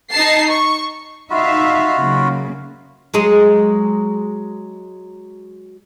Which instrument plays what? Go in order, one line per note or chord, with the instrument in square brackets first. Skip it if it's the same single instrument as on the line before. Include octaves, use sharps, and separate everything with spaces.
[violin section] D#4 A5 C7
C#6
[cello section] D#4 E5 F5 [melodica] F4 F#4 B5
[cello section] C#3 F#3 A#3
[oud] F#3 G#3 G#4